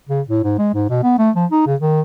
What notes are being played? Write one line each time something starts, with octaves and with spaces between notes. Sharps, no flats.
C#3
A2
G#2
G#3
G#2
B2
B3
A3
F3
D#4
C#3
D#3